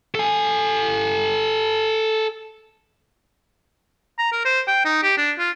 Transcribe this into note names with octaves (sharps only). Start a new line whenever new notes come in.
A4 G#5
A#5
A#4
C5
G5
D#4
G4
D4
F4